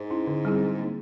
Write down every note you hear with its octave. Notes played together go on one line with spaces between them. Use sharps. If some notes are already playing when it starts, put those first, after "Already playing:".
Already playing: G#2
C#4 E4
D3
G3 C4 E4 G#4
F#3
A#3 D#4